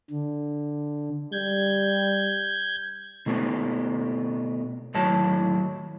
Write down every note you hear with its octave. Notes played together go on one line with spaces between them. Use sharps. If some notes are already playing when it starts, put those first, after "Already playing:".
D3
G3 G6 G#6
B2 A3 B3 C4
D#2 A2 F#3 C#5 A5